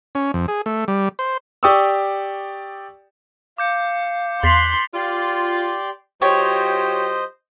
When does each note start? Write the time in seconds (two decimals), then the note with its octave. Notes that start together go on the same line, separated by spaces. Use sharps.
0.15 C#4
0.34 F2
0.48 G#4
0.66 A3
0.88 G3
1.19 C5
1.63 G4 D5 G5 C#6 D#6 E6
3.58 F5 D6 G6 C#7
4.43 E2 C6 F#6 A6 B6 F7
4.94 F4 G4 D5 C6
6.22 F#3 F4 G4 C5 C#5 D#5 G5